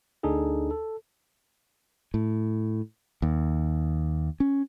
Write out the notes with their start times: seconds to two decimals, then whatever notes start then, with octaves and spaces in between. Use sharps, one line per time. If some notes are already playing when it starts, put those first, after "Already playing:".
0.23 D2 D4 D#4 G#4 A4
0.71 A4
2.14 A2
3.22 D#2
4.40 C#4